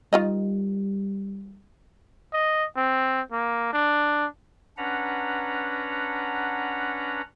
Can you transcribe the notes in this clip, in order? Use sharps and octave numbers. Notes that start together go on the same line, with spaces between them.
D#3 G3 F4 D#5
D#5
C4
A#3
D4
C#4 D4 B4 F#5 A#5